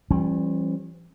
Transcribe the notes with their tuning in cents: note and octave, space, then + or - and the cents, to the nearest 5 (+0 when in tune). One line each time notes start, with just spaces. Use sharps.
E3 +45 G3 +0 C#4 -35